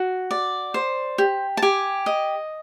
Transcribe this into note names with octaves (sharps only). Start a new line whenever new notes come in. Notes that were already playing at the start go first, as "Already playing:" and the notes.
Already playing: F#4
D5
C5
G4
A5
G4 G#5
D#5